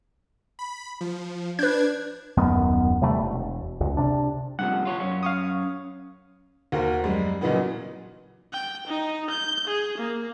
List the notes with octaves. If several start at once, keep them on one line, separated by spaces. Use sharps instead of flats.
B5
F3
D4 B4 G6 G#6
D#1 F#2 D#3 B3
C3 E3 G3 A3
E1
C#2
C3 D4
G2 C3 F3 F#5
F4 C#5
F#2 C#4
F5 C#6 D#6
D#2 F#4 A#4 C5
F#2 G3 G#3
A#2 C#3 E3 F#3 B3 D#4
G5
D#4
G6
G#4
A#3